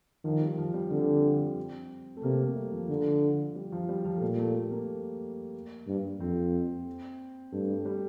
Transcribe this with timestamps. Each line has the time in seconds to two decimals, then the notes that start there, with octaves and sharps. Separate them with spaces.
0.24 D#3 F3
0.42 G3
0.58 F3
0.74 G3
0.91 D3 C4
2.17 A3
2.23 C3 A#3
2.40 A3
2.56 G3
2.72 F3
2.89 D3
3.55 G3
3.72 F3
3.89 G3
4.05 F3
4.17 A3
4.21 A#2 G3
4.39 A3
4.54 A3
4.71 A#3
5.87 G2
6.20 F2 C4
7.52 G2 A3
7.70 G3
7.86 G3